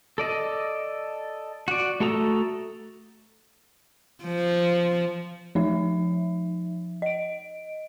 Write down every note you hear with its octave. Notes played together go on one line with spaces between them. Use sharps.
A4 D5 D#5
F#4 D5
A3 F#4 A4 A#5 D#6
F3
F3 D#4 E5
D#5 D7